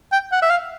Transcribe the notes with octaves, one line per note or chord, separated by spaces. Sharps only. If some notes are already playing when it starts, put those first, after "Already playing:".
G5
F#5
E5
F5